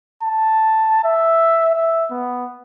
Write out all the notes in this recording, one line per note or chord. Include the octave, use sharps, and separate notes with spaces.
A5
E5
E5
B3